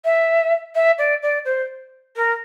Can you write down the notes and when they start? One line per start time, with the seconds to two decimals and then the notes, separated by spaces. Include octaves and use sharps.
0.04 E5
0.74 E5
0.98 D5
1.22 D5
1.44 C5
2.15 A#4